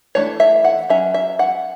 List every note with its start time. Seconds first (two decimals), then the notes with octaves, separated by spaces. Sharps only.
0.15 E3 A3 D4 C#5
0.40 E5
0.64 F#5
0.90 F#3 C#4 E5
1.14 E5
1.39 F#5